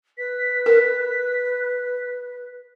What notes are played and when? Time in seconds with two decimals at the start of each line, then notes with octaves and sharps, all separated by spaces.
0.18 B4 B6
0.66 A#4